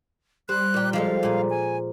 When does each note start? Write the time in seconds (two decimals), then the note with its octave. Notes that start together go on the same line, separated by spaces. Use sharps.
0.49 G3 C5 F#6
0.74 A#2 G4
0.93 F3 G#3 A4 F5
1.23 A#2 G#4
1.50 G#5